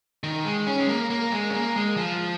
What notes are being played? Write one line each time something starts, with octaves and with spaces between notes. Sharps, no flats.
D#3
G#3
C#4
G#3
A#3
A#3
G#3
C#4
A#3
G#3
F3